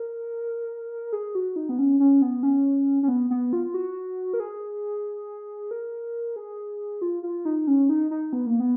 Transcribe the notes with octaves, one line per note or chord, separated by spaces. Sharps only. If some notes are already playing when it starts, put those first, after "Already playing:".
Already playing: A#4
G#4
F#4
D#4
B3
C#4
C#4
B3
C#4
C#4
B3
B3
F4
F#4
A#4
G#4
A#4
G#4
F4
F4
D#4
C#4
D#4
D#4
B3
A#3
B3